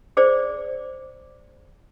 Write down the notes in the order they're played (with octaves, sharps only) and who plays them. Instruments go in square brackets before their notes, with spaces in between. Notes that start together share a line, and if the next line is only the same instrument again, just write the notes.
[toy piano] G#4 C5 D5